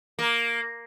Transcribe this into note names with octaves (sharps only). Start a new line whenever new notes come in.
A#3